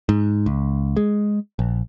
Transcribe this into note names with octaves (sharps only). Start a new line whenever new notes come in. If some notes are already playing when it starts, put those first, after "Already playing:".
G#2
C#2
G#3
A#1